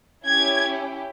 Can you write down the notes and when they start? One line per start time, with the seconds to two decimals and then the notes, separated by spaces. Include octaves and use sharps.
0.25 C#4 E4 G4 G#6